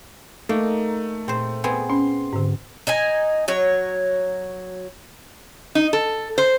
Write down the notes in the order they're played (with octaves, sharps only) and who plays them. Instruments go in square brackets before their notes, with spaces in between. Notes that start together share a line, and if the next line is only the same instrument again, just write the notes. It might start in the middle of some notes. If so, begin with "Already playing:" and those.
[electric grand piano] A3 [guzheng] A#3 D#4
[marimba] A#2 [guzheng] C4 C5
[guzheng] B3 C4 G#4
[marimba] C#4 [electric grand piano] C6
[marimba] G#2 D3
[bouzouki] D#4 D#5 G#5
F#3 C#5
[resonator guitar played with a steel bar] D#4
A4
C5